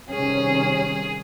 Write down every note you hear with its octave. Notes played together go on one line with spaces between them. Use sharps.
C3 D#3 G3 C#4 G#4